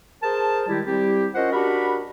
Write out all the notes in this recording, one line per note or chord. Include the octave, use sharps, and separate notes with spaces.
G#4 A#4 C5 A5
D#3 G3 G#3 E4 G4
G3 C4 E4 G4
C#4 F4 A#4 C5 D#5 F#5
D4 F#4 G4 A#4 B5